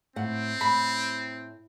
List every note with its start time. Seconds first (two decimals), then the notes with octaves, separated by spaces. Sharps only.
0.16 A2 C4 F#5
0.61 A2 B5